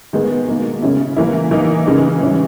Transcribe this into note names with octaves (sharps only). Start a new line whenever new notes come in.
D#3 G#3 B3 D#4
B2 A#3 D#4
C#3 G#3 C#4 E4
E3 A#3 E4
E3 A#3 D#4
C#3 E3 G#3 D#4
E3 G3 C#4 E4